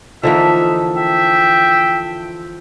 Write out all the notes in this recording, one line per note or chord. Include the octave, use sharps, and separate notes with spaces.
D3 E3 F3 A#3 D#4 A4 E5
E5 G5